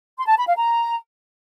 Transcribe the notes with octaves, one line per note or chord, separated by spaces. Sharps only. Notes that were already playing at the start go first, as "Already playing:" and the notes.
C6
A5
B5
F5
A#5